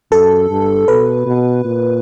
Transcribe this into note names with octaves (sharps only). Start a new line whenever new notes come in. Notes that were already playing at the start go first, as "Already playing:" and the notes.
F#2 A4
G2
B2 B4
B2
A#2